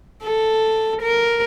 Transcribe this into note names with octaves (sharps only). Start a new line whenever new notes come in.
A4
A#4